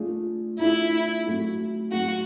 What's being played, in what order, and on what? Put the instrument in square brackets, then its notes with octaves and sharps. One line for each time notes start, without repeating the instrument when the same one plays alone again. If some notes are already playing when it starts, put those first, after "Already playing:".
Already playing: [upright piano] A3 D4 F4 G#4
[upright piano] A3 D4 F4 G#4 [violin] E4
[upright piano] A2 F#3 A3
[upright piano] A2 F#3 A3 [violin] F#4